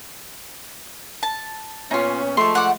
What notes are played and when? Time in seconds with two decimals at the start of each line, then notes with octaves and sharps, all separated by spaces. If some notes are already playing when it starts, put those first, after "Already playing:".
1.23 A5
1.91 A#2 B3 C#4 D#4 F4
2.37 F3 G#3 A3 C6 C#6
2.55 D5 F#5